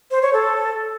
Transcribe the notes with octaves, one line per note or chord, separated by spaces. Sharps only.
C5
C#5
A4